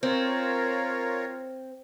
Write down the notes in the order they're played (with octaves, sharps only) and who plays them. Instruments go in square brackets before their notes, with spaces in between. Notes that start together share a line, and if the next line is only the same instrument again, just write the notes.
[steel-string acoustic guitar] C4 [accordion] F4 A#4 C#5